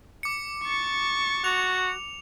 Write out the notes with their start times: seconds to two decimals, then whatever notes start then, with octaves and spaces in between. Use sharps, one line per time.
0.23 D6 C#7
0.64 C#6 A6
1.44 F#4 F7